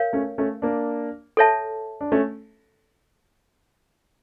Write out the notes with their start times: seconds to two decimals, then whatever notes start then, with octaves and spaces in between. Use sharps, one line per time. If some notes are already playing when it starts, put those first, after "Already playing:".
Already playing: A#4 C#5 F5
0.13 A3 C#4
0.38 A3 C#4
0.62 A#3 D4
1.37 A4 C#5 E5 A5
2.01 D4
2.12 A3 C#4